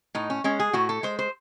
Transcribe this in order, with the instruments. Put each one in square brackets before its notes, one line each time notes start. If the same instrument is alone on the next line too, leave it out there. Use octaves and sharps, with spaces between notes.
[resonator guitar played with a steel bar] A2 D#4
C#4
G#3 C#4
G#4
A2 F#4
A4
G#3 C5
C5